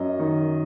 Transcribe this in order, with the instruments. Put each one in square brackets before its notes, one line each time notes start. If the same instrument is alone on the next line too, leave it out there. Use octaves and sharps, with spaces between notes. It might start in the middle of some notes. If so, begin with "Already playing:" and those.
Already playing: [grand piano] F#2 D#5
D#3